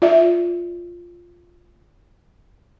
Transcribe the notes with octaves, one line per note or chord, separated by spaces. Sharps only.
F4 D5 E5